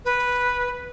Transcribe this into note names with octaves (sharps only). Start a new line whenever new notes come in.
B4